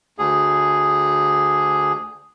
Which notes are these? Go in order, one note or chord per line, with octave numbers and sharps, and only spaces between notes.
D2 G#4